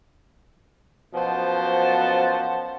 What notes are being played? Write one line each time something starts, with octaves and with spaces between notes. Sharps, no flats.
F#2 B2 F3 C5 F#5 A5